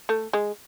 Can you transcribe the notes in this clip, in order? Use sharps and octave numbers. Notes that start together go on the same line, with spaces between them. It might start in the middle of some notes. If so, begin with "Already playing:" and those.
A3
G#3